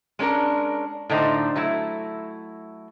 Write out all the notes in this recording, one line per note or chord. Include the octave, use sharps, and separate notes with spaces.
G#3 C#4 D4 A#4
A2 D3 D#4 C5
F#3 A3 E4